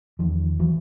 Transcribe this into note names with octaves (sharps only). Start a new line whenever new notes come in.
E2 D#3 F3
E3 F#3